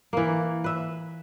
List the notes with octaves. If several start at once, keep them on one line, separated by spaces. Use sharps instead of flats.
E3 A#3
B4 E5